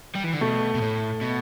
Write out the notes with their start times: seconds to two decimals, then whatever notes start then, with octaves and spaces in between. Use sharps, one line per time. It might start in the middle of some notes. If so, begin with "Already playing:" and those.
0.15 G3
0.24 E3
0.32 D3
0.41 B2 A3
0.75 B2
0.82 A2
1.22 B2